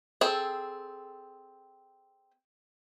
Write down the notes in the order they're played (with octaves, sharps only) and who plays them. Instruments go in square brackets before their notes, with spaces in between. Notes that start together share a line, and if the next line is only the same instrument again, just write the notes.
[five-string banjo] C4 G#4 A4